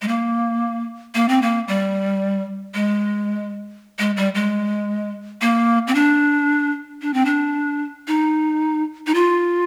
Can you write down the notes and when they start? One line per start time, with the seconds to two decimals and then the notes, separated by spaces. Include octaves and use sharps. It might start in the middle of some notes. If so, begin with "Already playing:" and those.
0.02 G#3
0.08 A#3
1.15 A#3
1.29 C4
1.42 A#3
1.68 G3
2.75 G#3
3.99 G#3
4.17 G3
4.35 G#3
5.41 A#3
5.87 C4
5.95 D4
7.02 D4
7.14 C4
7.25 D4
8.08 D#4
9.07 D#4
9.14 F4